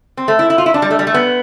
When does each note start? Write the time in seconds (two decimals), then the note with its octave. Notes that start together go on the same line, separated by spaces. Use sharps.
0.17 C4
0.28 A3
0.39 E4
0.50 E4
0.58 F4
0.66 E4
0.74 D4
0.82 G3
0.91 A3
0.99 G3
1.07 A3
1.14 B3